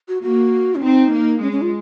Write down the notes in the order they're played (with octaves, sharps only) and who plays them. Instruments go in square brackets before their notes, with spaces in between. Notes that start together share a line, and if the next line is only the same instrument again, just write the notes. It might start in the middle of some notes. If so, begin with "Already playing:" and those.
[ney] F#4
[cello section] A#3 [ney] F#4
[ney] C#4
[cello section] C4 [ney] D#4
[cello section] A#3
[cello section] G#3 [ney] C#4
[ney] C#4
F4